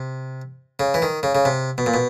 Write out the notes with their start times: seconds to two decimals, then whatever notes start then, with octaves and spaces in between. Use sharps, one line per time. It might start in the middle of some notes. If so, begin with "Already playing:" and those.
Already playing: C3
0.79 C#3
0.94 E3
1.02 D#3
1.23 C#3
1.35 C#3
1.45 C3
1.78 B2
1.86 A#2
1.94 B2